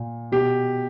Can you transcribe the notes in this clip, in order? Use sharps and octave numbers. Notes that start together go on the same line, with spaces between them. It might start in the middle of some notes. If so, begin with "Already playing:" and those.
Already playing: A#2
B2 G4